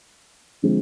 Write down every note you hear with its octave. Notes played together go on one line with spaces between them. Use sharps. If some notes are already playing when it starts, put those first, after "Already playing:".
D3 F3 G#3 C4